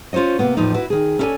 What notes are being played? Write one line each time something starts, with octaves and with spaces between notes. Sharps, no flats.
C#4 F4 C5 C#5 D#5
C3 A#3 B3
E2 A2 F3 D#4
E4 F#4 B4
D#3 G#4
C#4 E4 A4 C#5 D5 G#5